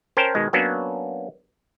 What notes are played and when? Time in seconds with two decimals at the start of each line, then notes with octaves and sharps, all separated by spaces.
0.17 C#4 A#4 C5 G5 A5
0.35 B2 D#3 G#3
0.53 F#3 A#3 B3 C#4 D4 F#4